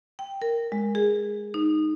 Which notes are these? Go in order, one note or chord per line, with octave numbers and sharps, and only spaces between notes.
G5
A#4
G#3
G#4
D#4